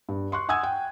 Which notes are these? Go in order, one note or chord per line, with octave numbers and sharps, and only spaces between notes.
G2
C6 C#6 F#6
F#5 G#5 D#6 E6 G#6
G5